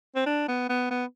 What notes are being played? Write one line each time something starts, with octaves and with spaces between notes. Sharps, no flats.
C4
D4
B3
B3
B3